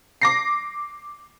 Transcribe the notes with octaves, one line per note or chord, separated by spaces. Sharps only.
D6 A#6 C7